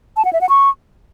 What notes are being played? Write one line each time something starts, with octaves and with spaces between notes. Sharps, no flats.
A5
F#5
E5
F#5
C#6